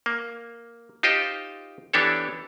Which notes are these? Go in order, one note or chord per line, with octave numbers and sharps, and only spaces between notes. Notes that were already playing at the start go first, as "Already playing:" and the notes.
A#3
D#4 F4 G4 C5 D#5
E3 B3 D4 G4 A4 C#5